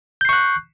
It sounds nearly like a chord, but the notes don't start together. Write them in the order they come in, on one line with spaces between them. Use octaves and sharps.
G6 C7 C#6 F#6